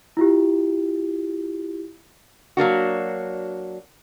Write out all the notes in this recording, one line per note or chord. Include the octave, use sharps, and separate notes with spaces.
E4 F4 G4
F#3 A#3 D4 F#4